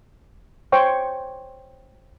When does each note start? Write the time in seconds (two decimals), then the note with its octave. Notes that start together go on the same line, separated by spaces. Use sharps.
0.72 C5 C#5 G5 C#6